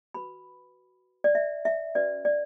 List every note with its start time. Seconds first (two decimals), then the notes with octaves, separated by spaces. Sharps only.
0.14 F#4 B4 B5
1.24 D5
1.35 E5
1.65 E5
1.95 C#4 F#4 B4 D5
2.25 D5